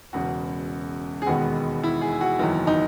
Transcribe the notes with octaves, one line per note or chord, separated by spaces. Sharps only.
E1 E2 C#3 F#4
G#4
E1 D#2 D#3 G#3 B3 F#4
E4
G#4
F#4
F#1 E2 D#3 F#3 E4
D#4